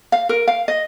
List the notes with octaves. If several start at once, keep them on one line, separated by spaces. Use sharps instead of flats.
F5
A#4
F5
D#5